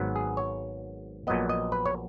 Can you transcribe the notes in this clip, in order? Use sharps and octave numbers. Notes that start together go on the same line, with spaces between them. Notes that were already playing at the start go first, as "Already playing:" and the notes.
Already playing: G#1 G#2 F#3 B3
G#4
C#5
A#1 A#2 F#3 B3 D#5
D#5
B4
C#5